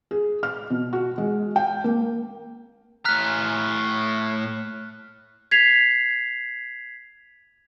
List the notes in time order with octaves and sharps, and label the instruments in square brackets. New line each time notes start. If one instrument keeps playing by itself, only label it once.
[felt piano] G#4
F6
B2
F#4
G#3
G5
A#3
[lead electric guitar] A2 A#5 [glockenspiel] F6 F#6 B6
[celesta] G#6 B6 C7 F7